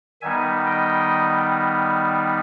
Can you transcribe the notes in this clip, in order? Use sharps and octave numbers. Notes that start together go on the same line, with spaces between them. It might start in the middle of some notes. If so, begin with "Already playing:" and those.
D#3 G3 B3 D#4 E5 G#5
D#5 G5